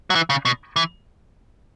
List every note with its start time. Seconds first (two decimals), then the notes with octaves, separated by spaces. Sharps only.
0.10 F#3
0.15 E3
0.30 C#3
0.45 B2
0.76 E3